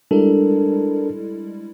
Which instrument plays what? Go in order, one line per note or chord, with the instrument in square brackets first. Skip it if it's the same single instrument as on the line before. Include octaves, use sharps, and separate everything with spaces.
[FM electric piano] G3 G#3 E4 [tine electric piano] D4 A4 A#4